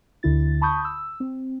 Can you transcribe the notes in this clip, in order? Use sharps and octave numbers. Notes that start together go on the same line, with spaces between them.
D2 D3 E4 A6
A5 B5 C#6 D#6 G6
E6
C4